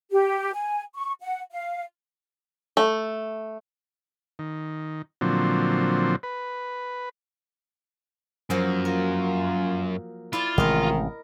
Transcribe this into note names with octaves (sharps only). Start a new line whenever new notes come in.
G4
G#5
C#6
F#5
F5
A3
D#3
A#2 D3 F3 F#3 C4
B4
F#2 F3 F#3 A#3
F4 A#4
E4 F4 D5 A5
A1 C3 D#3 G#3 A#4 D#5